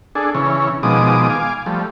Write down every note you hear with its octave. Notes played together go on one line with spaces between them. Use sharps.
D4 G#4 A4
C#3 E3 C#4
B2 D#3 F3 G#3 D6 D#6
F5 G#5 D6
F3 G3 A3